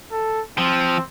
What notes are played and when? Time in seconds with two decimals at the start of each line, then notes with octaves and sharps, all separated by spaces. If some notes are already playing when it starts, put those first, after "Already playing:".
0.11 A4
0.58 F3 C4